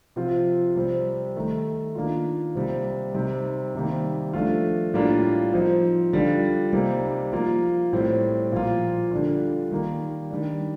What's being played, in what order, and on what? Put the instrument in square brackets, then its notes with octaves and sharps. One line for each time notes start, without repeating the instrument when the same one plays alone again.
[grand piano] C3 F3 C4 F4
C3 G3 C4
D#3 A3 D#4
D#3 A#3 D4 F4
C3 G3 A#3
C3 G3 C4 D#4
C3 D#3 G3 A#3
F3 A3 D4 F4
A2 G3 A#3 D4 F4
F3 C4 D#4
D3 G3 D4 F4
C3 G3 A#3 D#4
F3 A#3 F4
A2 G3 C4
A#2 F3 A#3 F4
D3 G3 D4 F4
D#3 G3 A#3
D#3 G3 D4